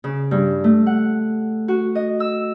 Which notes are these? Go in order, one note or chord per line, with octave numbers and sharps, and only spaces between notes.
C#3
G2
A3
F#5
F#4
D#5
E6